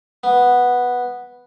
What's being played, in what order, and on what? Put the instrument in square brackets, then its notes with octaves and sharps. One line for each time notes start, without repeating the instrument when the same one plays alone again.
[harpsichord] B3